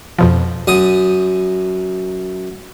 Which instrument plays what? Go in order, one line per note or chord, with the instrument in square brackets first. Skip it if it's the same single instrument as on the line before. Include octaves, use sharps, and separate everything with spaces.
[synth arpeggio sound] F2 B2 F3
[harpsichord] F#2 D#6